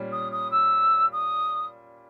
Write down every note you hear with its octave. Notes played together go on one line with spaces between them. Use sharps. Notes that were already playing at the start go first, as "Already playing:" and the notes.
Already playing: A#2 G3 C#4
D#6
D#6
E6
D#6